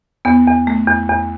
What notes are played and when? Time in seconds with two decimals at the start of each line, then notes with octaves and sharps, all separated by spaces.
0.25 E2 B3
0.47 E2
0.67 A3
0.87 E2
1.09 E2